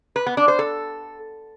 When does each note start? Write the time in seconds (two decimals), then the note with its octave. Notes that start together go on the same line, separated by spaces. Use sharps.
0.16 B4
0.26 B3
0.37 D4
0.48 C5
0.59 A4